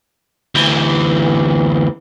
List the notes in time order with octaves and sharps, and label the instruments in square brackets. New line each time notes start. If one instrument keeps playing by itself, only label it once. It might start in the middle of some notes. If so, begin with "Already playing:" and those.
[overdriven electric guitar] D2 E3